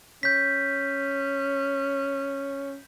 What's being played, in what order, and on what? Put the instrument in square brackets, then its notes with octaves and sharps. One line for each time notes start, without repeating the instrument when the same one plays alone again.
[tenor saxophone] C#4 [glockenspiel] G6 B6